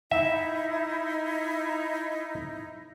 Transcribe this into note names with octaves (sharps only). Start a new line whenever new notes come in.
D#4 E4 E5